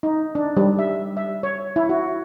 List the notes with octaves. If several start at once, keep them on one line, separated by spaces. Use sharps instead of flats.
D#4
D4
G3
E5
E5
C#5
E4
F#4